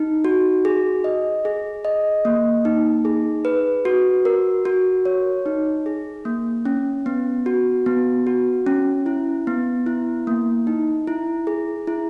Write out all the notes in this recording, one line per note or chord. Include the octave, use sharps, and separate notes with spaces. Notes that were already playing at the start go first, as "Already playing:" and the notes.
Already playing: D#4
F#4
G#4
D#5
G#4
D#5
A#3
D#4
G#4
B4
F#4
A#4
F#4
C#5
D#4
G#4
A#3
C#4
B3
F#4
B3
F#4
C#4
E4
B3
E4
A#3
D#4
E4
G#4
E4